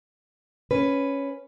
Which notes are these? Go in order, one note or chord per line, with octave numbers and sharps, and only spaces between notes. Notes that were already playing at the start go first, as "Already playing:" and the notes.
C#4 B4